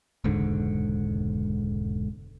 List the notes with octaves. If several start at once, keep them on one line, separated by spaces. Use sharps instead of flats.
E1 C#2 G#2 D3